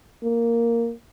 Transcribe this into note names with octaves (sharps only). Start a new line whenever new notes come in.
A#3